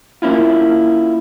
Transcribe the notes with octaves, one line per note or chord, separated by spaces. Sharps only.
A#3 C#4 E4 F4